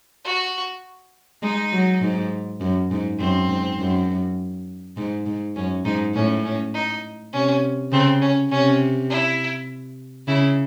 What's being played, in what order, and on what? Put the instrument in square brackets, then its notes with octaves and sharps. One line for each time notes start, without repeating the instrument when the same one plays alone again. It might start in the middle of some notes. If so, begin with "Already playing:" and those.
[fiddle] F#4
[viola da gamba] G#3 [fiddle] D#4
[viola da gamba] F#3
G#2
F#2
G#2
[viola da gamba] F#2 [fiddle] C4
[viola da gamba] G#2
F#2
G#2
G#2
[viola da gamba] F#2 [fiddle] C#4
[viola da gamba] G#2 [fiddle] D#4
[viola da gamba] A2 [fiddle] C#4
[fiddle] C#4
D#4
[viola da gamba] C3 [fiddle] C#4
[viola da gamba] C#3 [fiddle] C4
[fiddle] C#4
[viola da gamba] C3 [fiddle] C#4
[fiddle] E4
[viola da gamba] C#3 [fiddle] E4